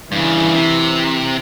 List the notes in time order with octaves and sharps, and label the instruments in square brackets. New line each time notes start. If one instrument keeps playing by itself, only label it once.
[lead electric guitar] G2 C#3 [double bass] E3
[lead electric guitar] C3